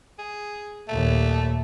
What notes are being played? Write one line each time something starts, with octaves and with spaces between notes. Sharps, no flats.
G#4
D#2 A#2 A3